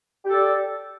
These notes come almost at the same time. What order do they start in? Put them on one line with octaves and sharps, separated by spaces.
G4 A4 D5